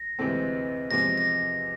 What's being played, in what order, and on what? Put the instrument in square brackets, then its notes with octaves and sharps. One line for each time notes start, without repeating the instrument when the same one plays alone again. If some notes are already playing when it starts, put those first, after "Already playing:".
Already playing: [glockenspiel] A#6
[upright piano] D2 C3 E3 G#3 C4
[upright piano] E2 C3 F3 G#3 C4 [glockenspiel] A#6
[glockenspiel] A#6